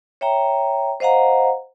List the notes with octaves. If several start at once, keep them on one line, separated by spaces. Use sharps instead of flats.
C#5 E5 G5 A#5
C5 D#5 F5 F#5 A#5